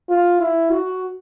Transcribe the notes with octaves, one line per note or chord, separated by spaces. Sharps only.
F4
E4
F#4